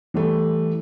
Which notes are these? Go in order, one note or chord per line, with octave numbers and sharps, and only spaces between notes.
E3 G3 A3